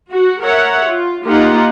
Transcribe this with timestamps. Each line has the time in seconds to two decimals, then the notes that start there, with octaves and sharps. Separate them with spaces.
0.12 F#4
0.42 A#4 C#5 E5 F#5
0.86 F4
1.24 A#3 D#4 F4 G4 A#4 F#5